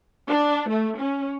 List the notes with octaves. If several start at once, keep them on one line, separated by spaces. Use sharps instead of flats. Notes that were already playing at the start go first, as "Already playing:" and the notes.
D4
A3
C#4